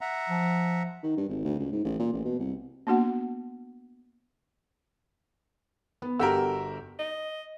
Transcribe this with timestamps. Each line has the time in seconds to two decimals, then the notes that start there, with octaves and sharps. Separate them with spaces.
0.01 E5 F#5 A#5
0.30 F3
1.03 D#3
1.17 G2
1.29 G#1
1.44 D2
1.59 C#2
1.72 G#2
1.84 A1
1.99 A#2
2.13 A1
2.25 B2
2.39 C2
2.87 A#3 B3 D4 F#4 F#5
6.02 B3
6.19 G1 F#4 G4 A4 A#4 E6
6.99 D#5